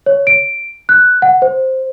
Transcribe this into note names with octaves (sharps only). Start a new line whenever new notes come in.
C#5
D7
F#6
F#5
C5